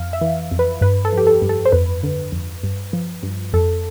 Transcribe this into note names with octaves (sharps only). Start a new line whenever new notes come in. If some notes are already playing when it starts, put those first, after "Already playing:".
Already playing: F2 F5
E5
E3
F2
B4
G2 B4
A4
F3
G4
A4
G2
A4
C5
F2 B4
D3
F2
G2
F3
G2
F2 A4